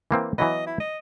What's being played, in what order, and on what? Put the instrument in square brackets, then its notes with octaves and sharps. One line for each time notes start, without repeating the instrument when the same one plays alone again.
[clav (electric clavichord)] E3 A#3 C4
[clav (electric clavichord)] E3 F#3 B3 [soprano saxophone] D#5
[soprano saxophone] E4
D#5